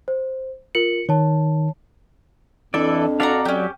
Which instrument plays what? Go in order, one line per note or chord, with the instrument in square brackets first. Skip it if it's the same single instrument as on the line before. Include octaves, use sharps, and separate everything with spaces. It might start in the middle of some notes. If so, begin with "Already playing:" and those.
[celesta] C5
[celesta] F4 A#4 F#7 [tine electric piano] C#7
[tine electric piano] D#3 [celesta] C#5 A5
[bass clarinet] F2 [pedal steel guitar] E3 E4 D5 [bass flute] D4 [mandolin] A4
[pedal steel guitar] F#4 A4 F5 [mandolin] D5 E5 A#5
[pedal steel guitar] F#3 [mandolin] C#4 G4 [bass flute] D5